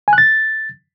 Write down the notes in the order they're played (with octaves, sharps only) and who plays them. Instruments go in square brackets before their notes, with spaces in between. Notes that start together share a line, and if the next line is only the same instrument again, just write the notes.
[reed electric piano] G#5
F#6
A6